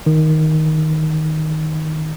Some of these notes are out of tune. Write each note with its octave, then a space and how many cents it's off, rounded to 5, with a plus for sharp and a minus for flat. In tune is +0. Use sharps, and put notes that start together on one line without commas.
D#3 +5